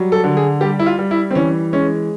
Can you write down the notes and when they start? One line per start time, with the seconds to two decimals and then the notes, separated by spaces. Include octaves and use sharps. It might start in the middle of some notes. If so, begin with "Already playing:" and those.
Already playing: F#3 G3
0.12 A4
0.24 D3
0.37 G#4
0.61 G3 G4
0.79 E4
0.86 F4
0.99 G3
1.11 E4
1.31 C4
1.35 E3 C#4
1.73 G#3 C#4